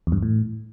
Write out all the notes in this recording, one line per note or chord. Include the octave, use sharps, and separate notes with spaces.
E2
G2
E2
A2